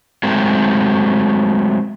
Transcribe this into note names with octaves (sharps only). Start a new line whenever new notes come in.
F#3 G#3 A3 C4